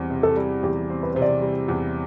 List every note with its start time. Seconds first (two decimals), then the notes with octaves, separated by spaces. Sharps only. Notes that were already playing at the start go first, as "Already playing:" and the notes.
Already playing: E2 G3 C4
0.10 C3
0.23 A4
0.37 G3
0.63 E2 G4
0.90 C4
1.03 B4
1.15 C3 C5
1.22 D5
1.41 G3
1.68 E2